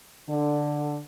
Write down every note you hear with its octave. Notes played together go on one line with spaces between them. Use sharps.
D3